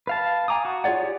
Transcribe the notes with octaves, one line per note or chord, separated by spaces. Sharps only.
B4 F5 A5
F5 G#5 A#5 D6 D#6
F#4
F4 G#4 C#5 D5 F#5
G4